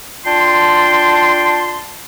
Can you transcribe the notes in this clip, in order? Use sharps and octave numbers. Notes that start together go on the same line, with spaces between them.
D4 F4 G5 A5 C6